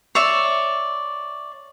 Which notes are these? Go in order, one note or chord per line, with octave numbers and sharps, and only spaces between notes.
C#5 D5 E5